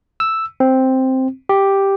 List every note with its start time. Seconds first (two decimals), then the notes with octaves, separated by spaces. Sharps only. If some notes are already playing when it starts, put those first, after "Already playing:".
0.20 E6
0.60 C4
1.49 G4